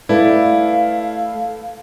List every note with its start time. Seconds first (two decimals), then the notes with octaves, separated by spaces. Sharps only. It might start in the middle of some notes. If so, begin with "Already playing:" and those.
0.09 A3 E4 B4 D5 F5